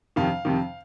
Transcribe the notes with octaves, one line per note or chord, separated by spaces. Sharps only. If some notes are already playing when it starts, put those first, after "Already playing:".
F2 C3 D#3 F5
F2 C3 D#3